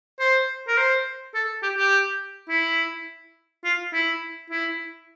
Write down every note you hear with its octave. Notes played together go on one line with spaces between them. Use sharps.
C5
A#4
C5
A4
G4
G4
E4
F4
E4
E4